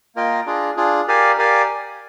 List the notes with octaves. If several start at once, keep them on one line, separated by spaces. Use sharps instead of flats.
A#3 F4 A#4 D#5 G5
D4 F4 G#4
D4 F4 G#4
G4 A#4 D5 F5 G#5
G4 A#4 D5 F5 G#5